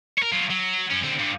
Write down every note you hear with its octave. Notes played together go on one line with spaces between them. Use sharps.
A#4 C#5
F#3 F4
F#3
F#2 C#4
D3 C4
G2 D3